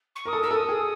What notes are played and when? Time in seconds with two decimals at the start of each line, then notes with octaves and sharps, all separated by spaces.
0.15 C#6
0.25 A#4 D#6
0.33 A4
0.42 A#4 E6
0.51 A4 D#6
0.69 G#4